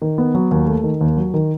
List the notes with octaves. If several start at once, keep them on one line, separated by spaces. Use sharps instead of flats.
D#3
B3
F#3
D#2
A3
D#3
D#2
F#3
D#3